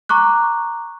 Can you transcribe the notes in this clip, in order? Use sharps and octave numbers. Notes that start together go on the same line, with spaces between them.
A#5 C#6 D6 F#6